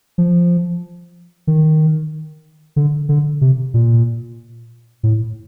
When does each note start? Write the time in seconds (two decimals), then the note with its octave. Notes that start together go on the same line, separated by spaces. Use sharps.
0.18 F3
1.47 D#3
2.76 D3
3.09 D3
3.41 C3
3.74 A#2
5.03 A2